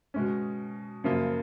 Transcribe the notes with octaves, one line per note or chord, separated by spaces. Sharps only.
B2 G#3 C#4
F#2 C#3 F3 A#3 F4